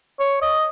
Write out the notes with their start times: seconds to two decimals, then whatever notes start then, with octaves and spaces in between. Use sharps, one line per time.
0.20 C#5
0.42 D#5